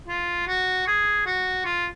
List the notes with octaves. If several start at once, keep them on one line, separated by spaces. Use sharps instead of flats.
F4
F#4
G#4
F#4
F4